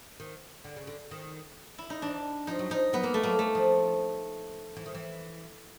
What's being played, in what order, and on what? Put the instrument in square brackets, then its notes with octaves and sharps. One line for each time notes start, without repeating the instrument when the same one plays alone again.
[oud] D#3
D3
C#3
D3
D#3
[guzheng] E4
D#4
[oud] E3 [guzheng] D4
[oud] F3 [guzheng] D#4
[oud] F#3
[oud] F3 [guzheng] D#4
[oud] F#3 [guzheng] B3
[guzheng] A#3
A3
[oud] F#3 [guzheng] A#3
[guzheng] A3
[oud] F3
E3
D#3
E3